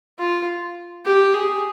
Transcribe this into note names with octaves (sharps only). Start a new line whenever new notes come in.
F4
G4
G#4